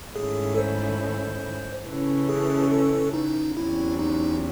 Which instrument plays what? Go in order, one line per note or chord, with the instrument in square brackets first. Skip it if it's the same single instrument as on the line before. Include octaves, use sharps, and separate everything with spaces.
[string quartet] G#2 D#3 A3 C#4 E4 [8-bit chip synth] G#4
[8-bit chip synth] A4
C5
[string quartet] C#3 E3 A3 C#4
[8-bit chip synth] G#4
A4
D#4
[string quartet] E2 C3 F#3 C#4 [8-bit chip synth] E4
[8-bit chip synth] D#4